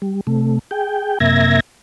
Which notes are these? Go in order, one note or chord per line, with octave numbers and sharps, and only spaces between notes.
G3
C3 A3
G#4 G5
F#2 C3 A#3 E5 G#6 A#6